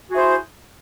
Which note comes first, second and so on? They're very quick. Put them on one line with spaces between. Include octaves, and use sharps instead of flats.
F#4 G#4 E4 C5